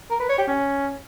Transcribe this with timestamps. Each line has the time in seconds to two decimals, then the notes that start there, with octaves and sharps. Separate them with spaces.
0.11 A#4
0.20 B4
0.29 C#5
0.38 G4
0.47 C#4